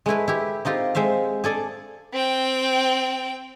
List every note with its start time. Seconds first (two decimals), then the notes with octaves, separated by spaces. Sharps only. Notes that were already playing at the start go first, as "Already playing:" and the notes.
0.06 G#3 A3 E4 B4
0.28 E4 G4
0.65 C4 D#4 F4 G4
0.95 G#3 C5 E5 F5
1.44 G#4 A4 D5 G#5
2.13 C4 G5